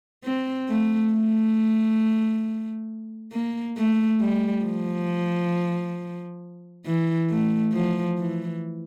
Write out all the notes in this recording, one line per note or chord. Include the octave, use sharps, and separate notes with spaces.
C4
A3
A3
A#3
A3
G3
F3
E3
A3
F3
E3